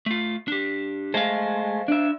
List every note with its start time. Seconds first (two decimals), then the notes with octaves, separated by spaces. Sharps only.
0.06 A3 F4
0.48 D4 G4
1.14 G#3 A3 C5 F5
1.88 D4 E5